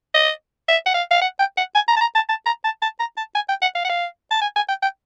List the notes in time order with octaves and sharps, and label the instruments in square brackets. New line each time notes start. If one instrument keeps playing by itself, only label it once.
[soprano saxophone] D#5
E5
F#5
F5
F5
F#5
G5
F#5
G#5
A#5
A5
A#5
A5
A5
A#5
A5
A5
A#5
A5
G#5
G5
F#5
F5
F#5
F5
A5
G#5
G#5
G5
G5